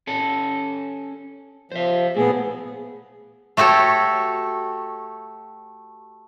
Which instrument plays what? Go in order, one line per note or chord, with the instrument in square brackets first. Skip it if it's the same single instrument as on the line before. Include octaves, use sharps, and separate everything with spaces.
[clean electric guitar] C#4 A4
[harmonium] F3 [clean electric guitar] C5 E5
[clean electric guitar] A#2 A3 [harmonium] B3 G#4
[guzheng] A3 F#4 G4 A4 C#5